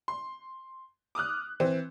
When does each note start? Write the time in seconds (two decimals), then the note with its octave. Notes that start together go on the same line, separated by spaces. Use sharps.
0.08 C6
1.15 D6 D#6 F6 F#6
1.60 E3 C4